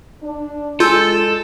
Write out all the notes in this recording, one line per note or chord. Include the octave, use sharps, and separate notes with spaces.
D4
G#3 F4 A4 G#5 E6 G6